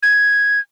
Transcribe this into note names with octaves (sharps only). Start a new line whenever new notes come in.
G#6